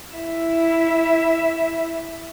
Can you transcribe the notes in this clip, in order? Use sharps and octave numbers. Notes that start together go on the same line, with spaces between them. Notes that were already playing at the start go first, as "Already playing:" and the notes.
E4 E5